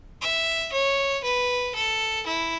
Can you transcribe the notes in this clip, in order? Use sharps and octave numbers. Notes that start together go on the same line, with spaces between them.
E5
C#5
B4
A4
E4